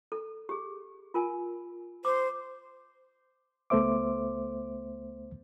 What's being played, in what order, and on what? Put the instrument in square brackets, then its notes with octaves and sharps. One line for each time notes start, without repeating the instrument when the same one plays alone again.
[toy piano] A4
G4 G#4
F4 A#4 G#5
[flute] C5 [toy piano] D6
[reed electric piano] C#2 A3 B3 C5 E5 D6